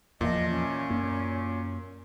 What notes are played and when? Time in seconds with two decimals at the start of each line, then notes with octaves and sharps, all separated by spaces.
0.21 E2 A#2 E3 F3 D#5
0.50 C#4
0.90 F#2 A#3